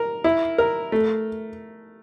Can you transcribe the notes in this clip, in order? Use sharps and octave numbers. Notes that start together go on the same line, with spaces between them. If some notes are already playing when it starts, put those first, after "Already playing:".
Already playing: A#4
E4
A#4
A3